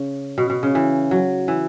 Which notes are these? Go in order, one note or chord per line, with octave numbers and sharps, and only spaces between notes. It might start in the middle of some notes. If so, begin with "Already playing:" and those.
Already playing: C#3
B2
B2
C#3
E3
F#3
E3